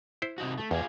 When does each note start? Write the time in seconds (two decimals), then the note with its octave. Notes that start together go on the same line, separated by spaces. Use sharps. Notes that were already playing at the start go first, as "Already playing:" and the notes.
0.22 E4 C5
0.38 C3 D#4 F#4
0.58 A3
0.71 E2 F4 G4 G#4